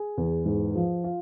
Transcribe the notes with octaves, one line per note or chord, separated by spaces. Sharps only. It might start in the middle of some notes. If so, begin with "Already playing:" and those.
Already playing: G#4
E2
G#2
F3
F4